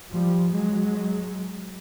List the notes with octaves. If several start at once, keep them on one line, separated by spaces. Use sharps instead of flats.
F3 G3
F#3 G#3